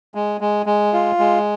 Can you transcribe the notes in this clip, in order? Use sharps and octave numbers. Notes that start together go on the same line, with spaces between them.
G#3
G#3
G#3
F4
G#3